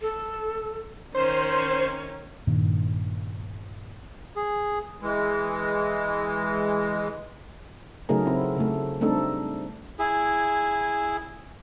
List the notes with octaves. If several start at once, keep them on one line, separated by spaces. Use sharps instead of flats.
A4
D#3 C#4 C5 C6 E7
G2 A#2 D#3
G#4
E3 G#3
C#3 F#3 A3 D#4 G#4 A#4
C4 E4
C#3 A3
G3 A3 C4 D4 D#4 A4
E4 G#4